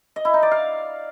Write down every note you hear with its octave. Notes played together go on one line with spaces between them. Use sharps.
D#5
E4
D#4
D5
F5